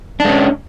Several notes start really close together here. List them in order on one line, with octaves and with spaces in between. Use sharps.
D4 G#3 C#4